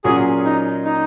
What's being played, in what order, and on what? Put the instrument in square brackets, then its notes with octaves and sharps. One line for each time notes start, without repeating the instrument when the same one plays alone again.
[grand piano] A#2 F#3 A#3 C#4 F4 [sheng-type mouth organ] G#4
[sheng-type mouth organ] D#4
D#4